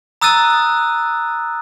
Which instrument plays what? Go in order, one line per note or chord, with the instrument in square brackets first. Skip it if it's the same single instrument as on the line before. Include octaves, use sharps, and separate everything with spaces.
[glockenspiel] A#5 D#6 E6 F#6 A6 D#7